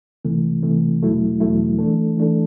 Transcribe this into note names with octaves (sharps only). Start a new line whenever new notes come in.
C2 C3 E3 A3
C2 C3 E3 A3
E2 B2 F#3 A3 E4
E2 B2 F#3 A3 E4
E3 A3 D4 A4
E3 A3 D4 A4